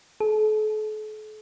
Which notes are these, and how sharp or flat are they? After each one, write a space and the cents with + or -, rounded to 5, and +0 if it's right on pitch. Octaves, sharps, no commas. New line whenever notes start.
A4 -45